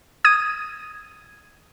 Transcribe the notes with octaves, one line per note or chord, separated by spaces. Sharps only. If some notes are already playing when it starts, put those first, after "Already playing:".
D#6 G#6 D#7